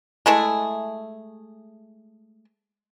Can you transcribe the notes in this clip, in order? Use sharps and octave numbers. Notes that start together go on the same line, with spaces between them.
G#3 A3 E4 G#4